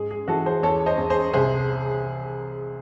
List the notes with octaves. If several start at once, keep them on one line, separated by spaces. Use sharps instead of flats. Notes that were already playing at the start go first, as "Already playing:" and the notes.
Already playing: G#2 G#4
G#4
E3 F#4 A4
G#4 C5
E2 A4 C#5
C5 D#5
E2
G#4 C5
C2 G#4 C5